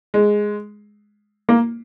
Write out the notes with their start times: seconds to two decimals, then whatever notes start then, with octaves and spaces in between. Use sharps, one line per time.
0.14 G#3
1.49 A#3